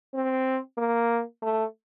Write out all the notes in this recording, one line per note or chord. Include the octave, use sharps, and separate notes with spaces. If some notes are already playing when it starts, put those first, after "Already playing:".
C4
A#3
A3